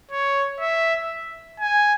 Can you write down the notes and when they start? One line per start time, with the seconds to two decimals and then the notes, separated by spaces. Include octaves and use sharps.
0.11 C#5
0.60 E5
1.60 G#5